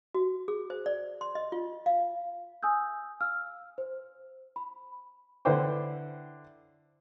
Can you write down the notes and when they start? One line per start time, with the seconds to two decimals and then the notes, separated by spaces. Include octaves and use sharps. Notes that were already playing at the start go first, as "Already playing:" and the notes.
0.15 F#4
0.48 G#4
0.70 C5
0.86 D5
1.21 C6
1.35 D#5
1.52 F4
1.86 F5
2.63 G#5 D#6 E6 G6
3.20 F5 E6 F6
3.78 C5
4.56 B5
5.45 D3 E4 B4 C5 G5 D6